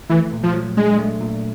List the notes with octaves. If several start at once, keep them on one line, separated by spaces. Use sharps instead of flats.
E3 A3
A#2
F3
F#3
G#3 D4
A3
A#2